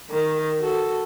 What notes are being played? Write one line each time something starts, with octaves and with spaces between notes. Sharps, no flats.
D#3
F#4 A4